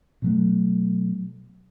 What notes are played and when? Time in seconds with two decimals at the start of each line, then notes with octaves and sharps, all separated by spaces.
0.22 B2 F#3 A3